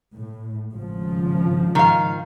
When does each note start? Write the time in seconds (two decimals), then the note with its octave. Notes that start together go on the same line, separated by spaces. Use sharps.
0.14 A2
0.73 G#1 C#3 F3
1.75 D#3 F5